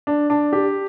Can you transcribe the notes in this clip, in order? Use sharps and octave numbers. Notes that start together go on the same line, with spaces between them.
D4
D4
G4